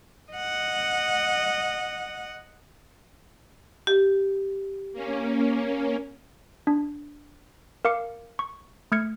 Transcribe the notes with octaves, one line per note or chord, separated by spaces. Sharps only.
D#5 F#5
G4
A#3 C#4
D4
A#4 F5 D6 C#7
C#6
A3 F6 G#6 C#7